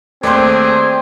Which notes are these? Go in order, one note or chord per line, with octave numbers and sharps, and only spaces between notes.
D#2 A3 C4 G#4 C5 D5